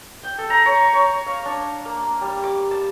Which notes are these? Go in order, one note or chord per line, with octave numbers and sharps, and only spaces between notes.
G5
A4
A#5
C#5
C#5
F5
D4
A#3
G3
D6
A5